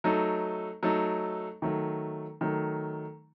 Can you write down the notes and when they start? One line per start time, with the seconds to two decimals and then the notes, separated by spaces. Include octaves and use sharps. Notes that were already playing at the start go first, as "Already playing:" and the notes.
0.04 F#3 A3 D#4 A4
0.83 F#3 A3 D#4 A4
1.62 D#3 F#3 A3
2.41 D#3 F#3 A3